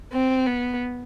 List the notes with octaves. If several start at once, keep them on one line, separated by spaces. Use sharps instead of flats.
C4
B3